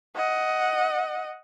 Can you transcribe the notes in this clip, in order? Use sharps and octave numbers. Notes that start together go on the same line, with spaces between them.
D#5 F#5